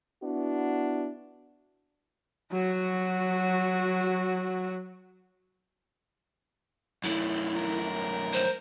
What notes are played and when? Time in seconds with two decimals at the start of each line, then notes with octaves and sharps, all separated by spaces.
0.23 B3 D4 E4 F#4
2.52 F#3 F#4
7.04 F#2 A3 E4
7.56 A#4
8.33 C5